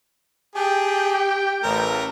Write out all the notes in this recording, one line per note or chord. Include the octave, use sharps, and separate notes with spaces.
G4 G#4 G5 A5
A1 A3 A#4 A#5